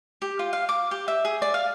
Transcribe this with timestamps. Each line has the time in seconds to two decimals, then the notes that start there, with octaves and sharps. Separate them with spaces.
0.22 G4
0.39 F4
0.53 F5
0.69 D6
0.91 G4
1.08 E5
1.25 G#4
1.42 D5
1.54 F5